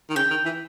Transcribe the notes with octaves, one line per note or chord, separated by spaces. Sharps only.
D#3
C#3 G5
D#3
E3